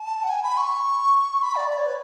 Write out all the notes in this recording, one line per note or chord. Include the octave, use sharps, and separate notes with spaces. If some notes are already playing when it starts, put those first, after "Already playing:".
Already playing: A5
F#5
G#5
B5
C#6
B5
D5
D5
C#5
B4